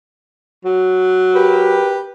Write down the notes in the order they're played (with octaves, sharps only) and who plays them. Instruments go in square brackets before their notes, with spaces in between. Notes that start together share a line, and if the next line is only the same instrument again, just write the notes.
[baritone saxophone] F#3
[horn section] G4 A#4 B4